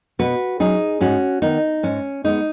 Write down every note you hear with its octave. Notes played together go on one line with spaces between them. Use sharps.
B2 F#4 B4
F#3 C#4 D#4 G#4
G#2 C#4 F#4
D#3 B3 D#4
G#2 C#4
G#3 B3 D#4